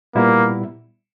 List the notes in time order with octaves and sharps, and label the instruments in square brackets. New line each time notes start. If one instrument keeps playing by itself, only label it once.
[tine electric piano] A#2 G3 B3 E4 [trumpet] A#3